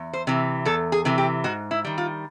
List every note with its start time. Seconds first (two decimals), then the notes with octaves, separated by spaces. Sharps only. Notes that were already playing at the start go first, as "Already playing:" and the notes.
Already playing: E2
0.13 C5
0.27 C3 E3
0.66 E2 A4
0.92 G#4
1.05 C3 E3
1.18 G4
1.44 G#2 F#4
1.71 E4
1.85 D#3 G3
1.98 F4